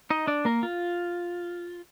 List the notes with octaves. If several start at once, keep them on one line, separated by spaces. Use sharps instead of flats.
D#4 D#5
D4 D5
A#3 A#4
F4